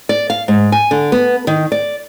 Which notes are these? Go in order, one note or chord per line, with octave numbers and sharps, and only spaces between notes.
D5
F5
G#2
G#5
D3
B3
D#3
D5